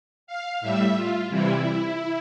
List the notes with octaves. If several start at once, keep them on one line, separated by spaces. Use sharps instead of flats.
F5
A2 G3 E5
F4
C3 E3 G3 E4